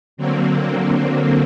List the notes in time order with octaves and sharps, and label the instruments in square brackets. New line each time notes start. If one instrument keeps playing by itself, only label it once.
[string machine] D3 F#3 A#3 C4